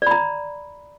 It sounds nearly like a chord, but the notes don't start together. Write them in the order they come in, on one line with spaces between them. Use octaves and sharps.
D5 B5 A#5